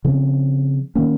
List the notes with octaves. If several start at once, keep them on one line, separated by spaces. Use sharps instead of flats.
C#3 F3 C4
D#3 A#3 C#4